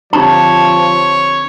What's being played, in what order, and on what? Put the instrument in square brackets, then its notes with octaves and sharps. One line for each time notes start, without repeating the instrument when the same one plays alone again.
[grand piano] D3 C4 G4 [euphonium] F3 [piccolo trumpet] C#5 [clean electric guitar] A5